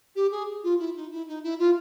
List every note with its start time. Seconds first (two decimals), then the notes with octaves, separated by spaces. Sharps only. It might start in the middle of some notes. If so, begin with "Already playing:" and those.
0.15 G4
0.31 G#4
0.63 F4
0.79 E4
0.95 D#4
1.11 E4
1.27 D#4
1.43 E4
1.59 F4